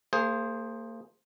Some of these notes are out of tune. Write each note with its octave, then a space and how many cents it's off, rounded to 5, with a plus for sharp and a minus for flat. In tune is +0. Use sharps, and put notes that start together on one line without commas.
A#3 -35 G#4 -5 C5 +10